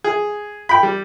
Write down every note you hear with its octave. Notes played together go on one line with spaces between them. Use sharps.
G#4
G5 B5
G3